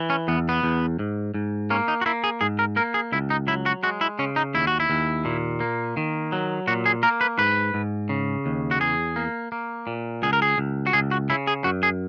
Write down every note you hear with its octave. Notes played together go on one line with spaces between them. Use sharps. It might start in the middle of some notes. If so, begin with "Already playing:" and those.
Already playing: E3
C#4
E2 B3
B3
E2
G#2
G#2
A#3 C#4
D#4
F#4
A#3 E4
G#4
G#2 G#4
A#4
A#3 A#4
G#4
C#2 E4
D#4
F#3 E4
F#4
G#3 F#4
E4
C#3 C#4
D#4
D#2 E4
F#4
E4
D#2
A#2
A#3
D#3
F#3
A#2 F#4
G#4
A#3 A#4
B4
G#2 B4
G#2
C#3
D#2
F#4
E2 G#4
A#3
A#3
A#2
C#2 G#4
A#4
G#4
C#2
F#4
C#2 G#4
F#4
C#3 E4
G#4
F#2 F#4
G#4